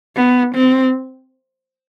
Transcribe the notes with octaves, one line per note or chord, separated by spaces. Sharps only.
B3
C4